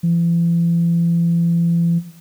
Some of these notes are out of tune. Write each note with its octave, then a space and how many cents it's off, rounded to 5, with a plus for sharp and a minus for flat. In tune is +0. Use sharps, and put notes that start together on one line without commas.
E3 +45